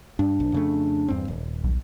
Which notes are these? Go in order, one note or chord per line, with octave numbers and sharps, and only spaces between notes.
G2 D4
B1
F2 C#3 A3
E2 G2 C4
D#1
B1